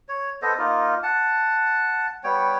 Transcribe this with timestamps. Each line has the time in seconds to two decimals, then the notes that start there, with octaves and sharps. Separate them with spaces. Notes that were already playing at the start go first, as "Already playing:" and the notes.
0.09 C#5
0.42 B3 A4 C5 D#5
0.58 A#3 D#4 F4
1.03 F#5 A5
2.24 G3 B3 C#5 G5